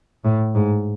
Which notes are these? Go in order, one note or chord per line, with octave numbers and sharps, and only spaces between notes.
A2
G#2